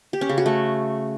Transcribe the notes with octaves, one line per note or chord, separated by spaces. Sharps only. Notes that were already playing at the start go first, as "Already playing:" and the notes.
G4
C#4
C#3
F#4
A3